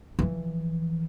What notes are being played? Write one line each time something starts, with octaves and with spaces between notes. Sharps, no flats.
E3 F3